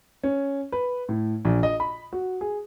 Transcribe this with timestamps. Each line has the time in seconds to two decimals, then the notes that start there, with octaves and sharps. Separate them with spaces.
0.23 C#4
0.72 B4
1.09 A2
1.45 A#1
1.63 D#5
1.80 B5
2.13 F#4
2.41 G#4